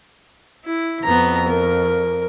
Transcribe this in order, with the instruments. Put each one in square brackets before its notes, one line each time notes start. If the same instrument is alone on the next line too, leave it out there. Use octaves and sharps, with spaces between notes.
[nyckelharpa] E4
[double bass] F2 [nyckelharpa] B3 A#5
[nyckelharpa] A#4